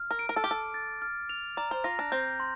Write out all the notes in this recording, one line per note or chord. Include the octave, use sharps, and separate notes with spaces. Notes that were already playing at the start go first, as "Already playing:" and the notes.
Already playing: F6
A#4
D7
A#4
A4
G4
A4 D6
A6
F6
F7
D5 A#5
C5
F4 A#6
D4
C4 G6
C6